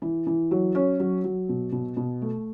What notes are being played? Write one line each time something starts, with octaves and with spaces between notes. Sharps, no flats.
E3
E3
F#3
C#4
F#3
F#3
B2
B2
B2
A3